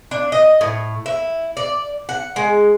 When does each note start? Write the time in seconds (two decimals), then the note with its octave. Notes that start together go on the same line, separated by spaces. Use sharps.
0.11 D4
0.32 D#5
0.61 A2
1.06 E4
1.57 D5
2.09 F#5
2.36 G#3